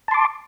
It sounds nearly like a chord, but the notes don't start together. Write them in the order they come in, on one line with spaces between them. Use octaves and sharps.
A5 C6 D6